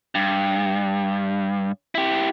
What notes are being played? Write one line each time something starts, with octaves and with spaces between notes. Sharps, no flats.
G2
E4 G4